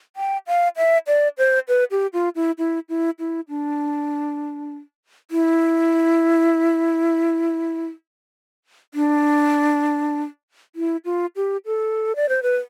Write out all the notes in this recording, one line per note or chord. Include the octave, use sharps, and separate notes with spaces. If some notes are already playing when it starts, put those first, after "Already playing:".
G5
F5
E5
D5
C5
B4
G4
F4
E4
E4
E4
E4
D4
E4
D4
E4
F4
G4
A4
D5
C5
B4